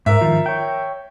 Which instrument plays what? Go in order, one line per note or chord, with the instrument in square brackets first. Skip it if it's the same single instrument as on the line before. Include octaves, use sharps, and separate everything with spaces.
[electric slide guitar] G#2 [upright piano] A#4 E5
[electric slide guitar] D#3 F3 F4
C#5 G5